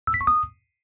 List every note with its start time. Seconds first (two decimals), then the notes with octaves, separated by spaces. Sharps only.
0.07 E6
0.14 B6
0.21 C#6
0.27 D#6